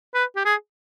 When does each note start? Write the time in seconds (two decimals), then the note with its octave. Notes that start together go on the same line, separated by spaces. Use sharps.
0.14 B4
0.36 G4
0.45 G#4